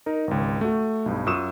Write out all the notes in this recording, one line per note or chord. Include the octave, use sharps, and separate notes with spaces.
D#4 A#4
G#1 C#2
A3 F#4
B1 G2
F#2 F4 C#6 D#6 E6 E7